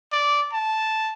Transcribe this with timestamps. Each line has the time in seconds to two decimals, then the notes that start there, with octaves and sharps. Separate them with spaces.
0.12 D5
0.53 A5